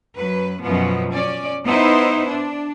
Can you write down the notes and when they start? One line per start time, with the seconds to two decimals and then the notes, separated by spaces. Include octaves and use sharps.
0.15 F#2 F#3 B4
0.61 F#2 B2 F3 B3
1.12 C#4 D5
1.65 B3 D#4 E4 B4 C5
2.27 D4